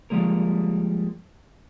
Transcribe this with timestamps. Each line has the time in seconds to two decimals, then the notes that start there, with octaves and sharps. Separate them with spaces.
0.10 F3 G3 G#3 A#3 A#4